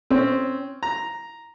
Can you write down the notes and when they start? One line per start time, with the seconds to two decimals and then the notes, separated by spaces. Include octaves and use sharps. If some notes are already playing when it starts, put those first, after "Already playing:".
0.11 C4 C#4
0.83 A#5